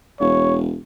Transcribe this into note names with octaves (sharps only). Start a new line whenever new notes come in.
E1 C#5